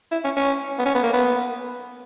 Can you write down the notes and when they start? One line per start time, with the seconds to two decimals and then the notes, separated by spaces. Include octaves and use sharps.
0.11 E4
0.24 C#4
0.37 C#4
0.79 B3
0.86 C#4
0.95 B3
1.03 A#3
1.13 B3